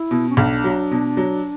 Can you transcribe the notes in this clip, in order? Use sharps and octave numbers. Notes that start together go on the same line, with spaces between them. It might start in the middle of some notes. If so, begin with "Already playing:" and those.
Already playing: E4
B2
C#4
B1 D4
F#3
B2
F#3